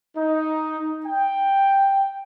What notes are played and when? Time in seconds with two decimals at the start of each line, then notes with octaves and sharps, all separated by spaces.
0.17 D#4
1.06 G5